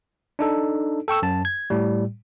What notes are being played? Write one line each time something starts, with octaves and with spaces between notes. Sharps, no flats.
D4 D#4 A4
A4 G5 C#6 E6
F#2 A5
G#6
A2 G3